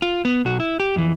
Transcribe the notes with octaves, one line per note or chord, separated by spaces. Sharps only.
F4
B3
B1 F#4
E4
G4
F2 E3